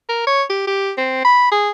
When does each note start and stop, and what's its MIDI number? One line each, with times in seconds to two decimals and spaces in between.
0.09 0.24 70
0.27 0.43 73
0.50 0.64 67
0.67 0.92 67
0.97 1.20 60
1.25 1.49 83
1.52 1.71 68